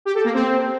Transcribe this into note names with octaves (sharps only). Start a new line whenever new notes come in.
G4
A4
A#3
C4